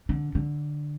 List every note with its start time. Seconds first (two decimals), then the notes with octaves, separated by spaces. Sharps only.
0.09 D3
0.35 D3